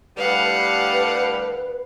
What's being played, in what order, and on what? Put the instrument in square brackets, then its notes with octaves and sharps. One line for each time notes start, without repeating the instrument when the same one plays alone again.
[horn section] A2 D3 G3 [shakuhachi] B4 [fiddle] F5 F#5